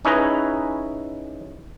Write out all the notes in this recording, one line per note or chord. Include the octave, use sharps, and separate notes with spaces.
C#4 D#4 E4 G#4 B4 D#5